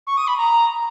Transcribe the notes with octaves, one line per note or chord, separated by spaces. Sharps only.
C#6
D#6
B5
A#5